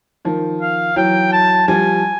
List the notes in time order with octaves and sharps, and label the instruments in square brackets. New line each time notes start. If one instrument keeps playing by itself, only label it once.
[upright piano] D#3 F3
[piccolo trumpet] F5
[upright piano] E3 F#3 [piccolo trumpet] G5
[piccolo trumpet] A5
[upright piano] F3 G3 [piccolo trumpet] G#5